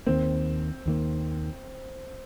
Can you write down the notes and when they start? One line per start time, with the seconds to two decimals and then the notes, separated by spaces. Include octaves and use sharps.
0.06 D#2 D#3 A#3 C4
0.86 D#2 D#3 A#3